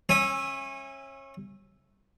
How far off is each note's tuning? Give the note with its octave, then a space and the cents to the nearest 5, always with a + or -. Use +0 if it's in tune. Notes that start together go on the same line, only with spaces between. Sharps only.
C#4 -30 E5 +0 G#5 -10